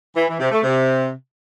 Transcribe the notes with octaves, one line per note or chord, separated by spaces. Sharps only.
E3
E3
C3
A3
C3